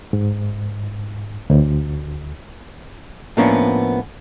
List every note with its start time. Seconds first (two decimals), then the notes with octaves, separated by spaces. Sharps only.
0.13 G#2
1.50 D2
3.37 A2 F3 A#3 B3 C#4 D4